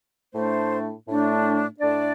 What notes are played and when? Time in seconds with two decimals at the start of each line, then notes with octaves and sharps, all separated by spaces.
0.34 A2 A3 D4 C5
1.06 A2 A3 D4
1.80 A2 A3 D4 D5